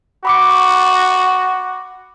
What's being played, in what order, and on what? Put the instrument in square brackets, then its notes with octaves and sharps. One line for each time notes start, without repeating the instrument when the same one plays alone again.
[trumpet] F#4 [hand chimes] B5 D6 C#7